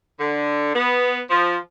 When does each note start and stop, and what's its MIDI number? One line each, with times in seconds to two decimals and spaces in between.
0.18 0.73 50
0.74 1.18 59
1.28 1.56 53